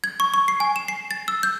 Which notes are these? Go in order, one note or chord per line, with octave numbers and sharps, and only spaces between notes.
G#6
C#6
C#6
C7
G#5
E7
C7
A6
E6
G6